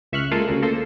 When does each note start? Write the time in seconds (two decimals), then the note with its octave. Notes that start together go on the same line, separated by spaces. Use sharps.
0.13 C#2 E5 C#6 F6 F#6
0.31 G#3 A#3 F4 A4 F5
0.48 D2 C#3 A#3
0.62 A#3 A4 C5